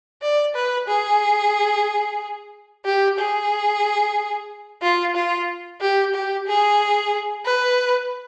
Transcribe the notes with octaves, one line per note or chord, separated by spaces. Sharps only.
D5
B4
G#4
G4
G#4
F4
F4
G4
G4
G#4
B4